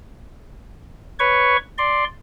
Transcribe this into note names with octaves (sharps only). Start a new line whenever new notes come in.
B4 C#5 C#6
D5 C6